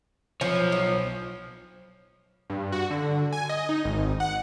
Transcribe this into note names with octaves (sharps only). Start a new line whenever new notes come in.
B1 F3 C#5
F3
G2
F#4
D3
G#5
D#5
D#4
G#1
F#5